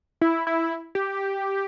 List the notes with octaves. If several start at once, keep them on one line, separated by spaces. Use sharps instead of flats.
E4
E4
G4